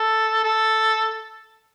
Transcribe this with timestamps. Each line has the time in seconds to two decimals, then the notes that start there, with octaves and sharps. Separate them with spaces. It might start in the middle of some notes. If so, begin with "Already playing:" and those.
Already playing: A4
0.43 A4